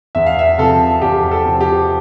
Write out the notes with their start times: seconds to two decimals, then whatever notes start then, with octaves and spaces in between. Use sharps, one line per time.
0.15 E2 E5
0.26 F5
0.39 E5
0.58 C3 F3 C4 A4
1.02 E2 G4
1.31 A4
1.45 C3 F3 C4
1.61 G4